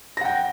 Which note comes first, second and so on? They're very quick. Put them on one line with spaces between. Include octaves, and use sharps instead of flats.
A#6 F#5 G5